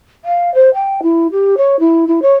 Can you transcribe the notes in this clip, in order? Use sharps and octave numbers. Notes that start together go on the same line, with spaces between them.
F5
C5
G5
E4
G4
C#5
E4
E4
C#5